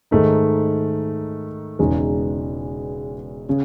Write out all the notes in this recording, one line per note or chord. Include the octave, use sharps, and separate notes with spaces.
G#2 D#3 A3 D#4
E1 E2 C#3 G#3 D#4
C#3